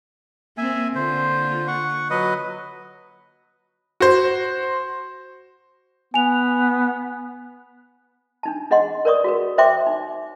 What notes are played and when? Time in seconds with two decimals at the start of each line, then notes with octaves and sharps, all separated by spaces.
0.58 A#3 C4 E5 G#5
0.95 D3 A#3 F4 C5
1.68 F#5 C#6
2.10 F#3 B4 D#5
4.00 F#4 C5
6.14 B3 G#5 F7
8.43 D4 D#4 A5
8.71 D4 G#4 D#5 F#5 C6
9.05 A#4 B4 C#5 D5 C#6 D#6
9.24 F#4 G#4 B4
9.58 C5 C#5 E5 G5 C6 D6
9.87 D#4